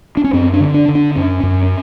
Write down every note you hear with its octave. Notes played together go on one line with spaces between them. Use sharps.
D4
C#4
F#2 C4
D4
D3
D4
D3
D4
F#2 C#4
F#2